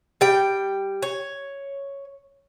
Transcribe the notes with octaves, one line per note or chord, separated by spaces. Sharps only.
G3 G5
C#5